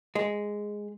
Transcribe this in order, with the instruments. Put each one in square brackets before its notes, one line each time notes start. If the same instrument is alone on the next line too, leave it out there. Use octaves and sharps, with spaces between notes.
[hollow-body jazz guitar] G#3